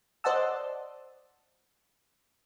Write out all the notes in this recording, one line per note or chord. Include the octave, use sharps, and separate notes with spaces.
C5 D5 D#5 F#5 A5 E6